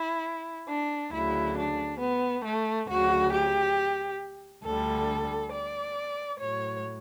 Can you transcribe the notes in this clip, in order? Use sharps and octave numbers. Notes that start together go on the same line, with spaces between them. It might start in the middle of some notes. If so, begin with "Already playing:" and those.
Already playing: E4
D4
D2 C#3 F#3 E4
D4
B3
A3
D2 C#3 F#3 F#4
G4
D2 D3 G3 A4
D5
A2 F#3 C#5